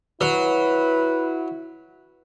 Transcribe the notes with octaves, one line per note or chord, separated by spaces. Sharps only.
F#3 E4 B4